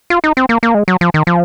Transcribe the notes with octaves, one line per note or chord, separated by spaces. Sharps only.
F4
D#4
C4
A#3
A#3
G#3
F#3
F3
D#3
F3